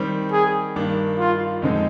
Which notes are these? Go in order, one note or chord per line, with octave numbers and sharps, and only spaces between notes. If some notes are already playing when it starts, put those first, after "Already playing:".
Already playing: D#3 G3 C4
G#4
G2 D#3 A#3 D4
F4
F2 D3 G#3 C4 D#4